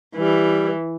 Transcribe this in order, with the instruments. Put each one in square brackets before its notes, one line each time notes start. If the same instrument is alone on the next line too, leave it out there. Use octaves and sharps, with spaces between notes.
[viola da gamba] E3 [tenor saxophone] G3